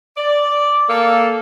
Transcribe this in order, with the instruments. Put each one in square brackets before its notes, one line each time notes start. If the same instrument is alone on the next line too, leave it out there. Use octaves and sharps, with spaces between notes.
[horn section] D5
A#3 A4